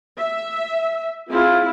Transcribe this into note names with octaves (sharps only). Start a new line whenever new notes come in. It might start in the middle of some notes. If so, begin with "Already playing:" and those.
E5
C4 E4 F4 G#4